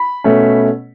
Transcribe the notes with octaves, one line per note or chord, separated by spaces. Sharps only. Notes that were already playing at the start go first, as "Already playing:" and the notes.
Already playing: B5
B2 A3 C#4